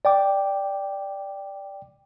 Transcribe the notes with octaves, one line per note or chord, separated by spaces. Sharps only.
D5 G5 D6